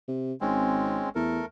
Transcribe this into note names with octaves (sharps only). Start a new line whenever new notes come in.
C3
G#1 G#3 C4 C#4
E2 A3 A4 A#4